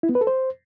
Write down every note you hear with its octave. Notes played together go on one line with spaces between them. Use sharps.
E4
B3
B4
A4
C5